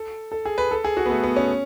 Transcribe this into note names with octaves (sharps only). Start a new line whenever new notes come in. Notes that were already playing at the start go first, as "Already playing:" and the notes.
Already playing: A4
A4
G#4
B4
A4
G#4
F#4
B3
A3
B3
C#4